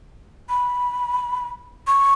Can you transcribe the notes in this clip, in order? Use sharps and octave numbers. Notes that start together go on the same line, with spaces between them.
B5
C#6